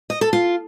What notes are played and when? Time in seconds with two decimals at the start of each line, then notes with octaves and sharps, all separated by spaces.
0.10 D#5
0.21 A4
0.33 F4